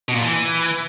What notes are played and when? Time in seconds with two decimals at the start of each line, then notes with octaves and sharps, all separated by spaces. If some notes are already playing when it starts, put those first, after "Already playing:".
0.09 B2
0.15 A#2
0.22 E3